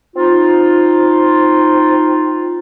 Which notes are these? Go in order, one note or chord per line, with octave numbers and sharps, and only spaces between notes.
C4 D#4 F4